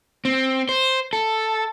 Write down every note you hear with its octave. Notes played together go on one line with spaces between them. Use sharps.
C4
C5
A4